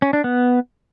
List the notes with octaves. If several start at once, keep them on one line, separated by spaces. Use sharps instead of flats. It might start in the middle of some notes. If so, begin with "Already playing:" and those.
C#4
D4
B3